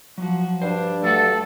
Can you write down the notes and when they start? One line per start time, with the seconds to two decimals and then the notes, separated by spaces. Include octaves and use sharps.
0.18 F3 F#3 F#4
0.62 G2 D4 C5
1.04 F#3 A3 A4 F#5